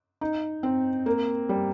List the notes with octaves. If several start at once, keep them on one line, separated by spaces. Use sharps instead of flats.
D#4
C4
A#3
G3